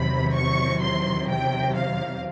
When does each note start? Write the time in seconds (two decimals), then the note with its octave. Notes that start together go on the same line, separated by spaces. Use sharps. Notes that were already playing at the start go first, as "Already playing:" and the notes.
Already playing: E2 C3 D#3 F#3 B5
0.35 C#6
0.82 C6
1.29 G5
1.76 F5